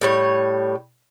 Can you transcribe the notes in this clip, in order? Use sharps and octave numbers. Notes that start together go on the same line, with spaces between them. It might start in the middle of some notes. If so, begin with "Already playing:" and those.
A2 G3 C#5